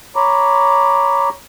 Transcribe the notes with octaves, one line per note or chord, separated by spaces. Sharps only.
C#5 A#5 B5 D6